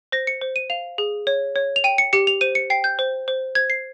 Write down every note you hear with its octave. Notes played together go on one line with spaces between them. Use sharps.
C5 A#6
C#7
C5
D#7
F5 F7
G#4
C#5
C#5
F7
G5 D#7
C#7
G4 C#7
F7
C5 D#7
C#7
G5 C7
G6
C5
C5
C5 G#6
C7